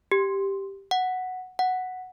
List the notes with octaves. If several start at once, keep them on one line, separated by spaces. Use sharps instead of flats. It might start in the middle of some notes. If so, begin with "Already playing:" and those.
G4
F#5
F#5